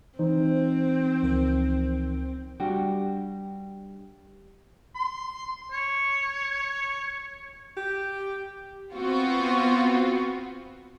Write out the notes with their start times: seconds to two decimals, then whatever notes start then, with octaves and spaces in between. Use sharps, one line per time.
0.19 E3 C4 D#4 C5
1.23 C#2 F3 A#4
2.60 G3 D4 F#4 G4
4.95 C6
5.71 C#5
7.77 G4
8.94 B3 C4 F4 F#4